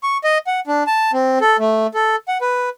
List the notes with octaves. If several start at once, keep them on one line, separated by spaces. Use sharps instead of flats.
C#6
D#5
F#5
D4
A5
C4
A4
A3
A4
F#5
B4